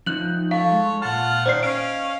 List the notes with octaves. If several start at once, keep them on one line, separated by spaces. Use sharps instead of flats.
F3 D#4 F#6 F#7
A4 C#5 F5
G#3
A#2 F4 F#5 A5 F6
D#3 C5 D5 C7
C#4 D#5 F5 D7